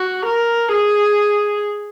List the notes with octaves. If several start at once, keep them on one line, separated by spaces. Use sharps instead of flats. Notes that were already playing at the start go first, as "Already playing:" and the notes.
Already playing: F#4
A#4
G#4